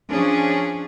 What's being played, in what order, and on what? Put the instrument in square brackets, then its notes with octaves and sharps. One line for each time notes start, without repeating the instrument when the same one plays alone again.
[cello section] F3 C#4 D4 G#4